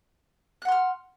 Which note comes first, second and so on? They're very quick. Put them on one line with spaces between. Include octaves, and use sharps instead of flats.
F#6 F#5 C6 F6